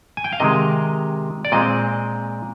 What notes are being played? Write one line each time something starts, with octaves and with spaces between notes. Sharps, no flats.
G#5
G5
F5
C3 D#3 G#3 D#5
D5
A#2 G#3 C4 D#5